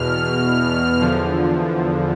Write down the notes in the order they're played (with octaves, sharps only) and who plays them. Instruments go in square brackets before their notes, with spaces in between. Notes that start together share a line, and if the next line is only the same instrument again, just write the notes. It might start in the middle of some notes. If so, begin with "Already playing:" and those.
Already playing: [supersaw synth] E2 B2 F6
E2 D3 F3